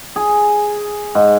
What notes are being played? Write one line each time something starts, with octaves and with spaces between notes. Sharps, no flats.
G#4
G#2